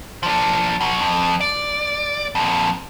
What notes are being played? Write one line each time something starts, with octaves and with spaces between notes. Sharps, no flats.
F3 D4
B2 F#3
F2
D5
F2 A#2